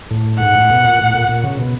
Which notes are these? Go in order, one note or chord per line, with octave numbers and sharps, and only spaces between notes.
A2
G#2 F#5
A2
B2
A#2
A2
A#2
A#2
C#3
B2